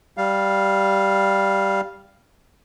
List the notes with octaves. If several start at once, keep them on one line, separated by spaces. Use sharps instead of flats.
G3 F5